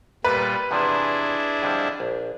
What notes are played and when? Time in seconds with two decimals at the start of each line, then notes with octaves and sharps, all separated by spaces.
0.24 A#2 G3 B4
0.71 E2 C3 F3 D4 E4 G#4
1.63 F2 D3 G3
2.00 A#1